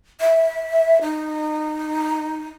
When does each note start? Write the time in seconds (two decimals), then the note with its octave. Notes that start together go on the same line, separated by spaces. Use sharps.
0.21 E5
1.02 D#4